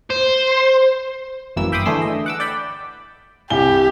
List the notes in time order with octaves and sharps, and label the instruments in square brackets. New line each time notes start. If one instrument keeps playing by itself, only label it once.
[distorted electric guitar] C5
[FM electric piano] G1 F#2 E3 A#3 E6
E5 G5 B5 C6 D6 D#6
D3 E3 A3 G#4 C6 E6
D#5
F#5 D6 E6
D5 G5 B5
[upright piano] C2 G#5 G7 [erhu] G4